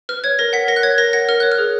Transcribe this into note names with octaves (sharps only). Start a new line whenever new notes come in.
B4 F6
C#5 G#6
A#4 A#6
F#5 B6
A#4 A#6
F#6
C#5 G#6
A#4 A#6
F#5 A#6
A#4 F6
C#5 F#6
F6
G#4